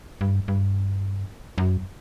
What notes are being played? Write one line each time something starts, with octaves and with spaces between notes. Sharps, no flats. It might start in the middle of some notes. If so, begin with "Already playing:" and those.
G2
G2
F#2